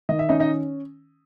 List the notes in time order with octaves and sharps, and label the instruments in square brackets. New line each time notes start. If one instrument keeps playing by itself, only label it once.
[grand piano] D#3 [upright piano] D#5
[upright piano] E5
[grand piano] C#4 [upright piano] D#4 D#5
[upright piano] D#4 D#5